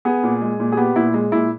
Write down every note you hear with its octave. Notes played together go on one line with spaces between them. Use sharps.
B3 G#4
A#2
G#3
A#2
G#4
B3 G4
A#2 E4
G#3
A#2 E4